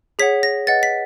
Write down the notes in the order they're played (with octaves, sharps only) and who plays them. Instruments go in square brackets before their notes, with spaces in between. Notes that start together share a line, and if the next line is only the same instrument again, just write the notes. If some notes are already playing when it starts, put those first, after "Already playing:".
[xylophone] G#4 C#5 F#5 B6
A#6
B4 D#5 F#5 A6
B6